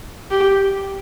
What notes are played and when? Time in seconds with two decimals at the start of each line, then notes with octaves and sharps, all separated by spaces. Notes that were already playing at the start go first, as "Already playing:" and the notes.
0.31 G4